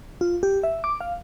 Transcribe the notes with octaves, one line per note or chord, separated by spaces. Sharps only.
F4
G4
E5
D6
F5